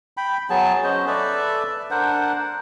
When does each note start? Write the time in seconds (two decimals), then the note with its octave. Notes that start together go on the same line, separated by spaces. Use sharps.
0.17 G5 B5
0.50 F#3 B3 G#4 A5
0.84 C#4 C5 D#5
1.07 A4 B4 D5 E5
1.91 D4 A#4 C5 F#5